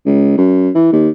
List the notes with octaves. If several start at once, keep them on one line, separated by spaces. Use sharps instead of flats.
C#2
F#2
E3
D#2